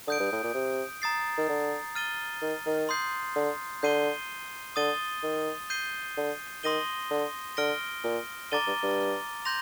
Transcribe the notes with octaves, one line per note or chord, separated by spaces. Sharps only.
D3 D#6 G6 D7
G2
A2
A#2
C3
A#5 D#6 A6 C7
D#3
D3
F6 A6 D#7 G7
D#3
D#3
C6 D#6 G6 C7
D3
D3 G6 C7 D#7 G7
D3 D#6 A6 D#7 G7
D#3
G6 C7 D#7 G7
D3
D#3 C6 D#6 A#6 D#7 G7
D3
D3 F6 A#6 D7 G7
A#2
D3 A#5 D6 A6 D#7 G7
G2
G2
C6 G6 A#6 F7